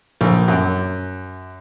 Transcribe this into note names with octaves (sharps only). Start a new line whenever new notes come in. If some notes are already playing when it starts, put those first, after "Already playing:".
A#1
F#2